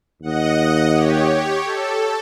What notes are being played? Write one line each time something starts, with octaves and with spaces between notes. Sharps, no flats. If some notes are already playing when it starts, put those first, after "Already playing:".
D#2 D#5 F#5
G4 C#5
A4